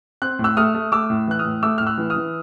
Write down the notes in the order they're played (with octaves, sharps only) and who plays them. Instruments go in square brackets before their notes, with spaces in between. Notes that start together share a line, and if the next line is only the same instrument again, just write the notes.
[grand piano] C4 F#6
A2
E6 F#6
A3 D#6 F6
A3
A3 D6 E6
A2
E3 F#6
D#6 F6
A2
A3 D6 E6
A2 F6
E6 F#6
E3
D#6 F6
E3